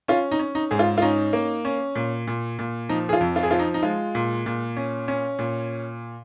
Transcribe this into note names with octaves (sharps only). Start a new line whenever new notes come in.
C#4 F4
D#4
C#4
D#4
G#2 G#4
F4
F4
C#4 D#4
A#3
C#4
A#2
A#2
A#2
F3 D#4
G#4
F4
F2
F4
G#4
F3 F4
D#4
D#4
G#3 F4
A#2
A#2
C#4
C#4
A#2